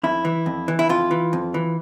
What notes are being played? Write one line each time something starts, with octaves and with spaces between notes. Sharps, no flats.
F2 E4
E3
F2
E3
E4
F2 F4
E3
F2
E3